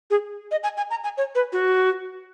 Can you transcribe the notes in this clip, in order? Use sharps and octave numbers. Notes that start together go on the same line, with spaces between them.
G#4
D#5
G#5
G#5
A#5
G#5
C#5
B4
F#4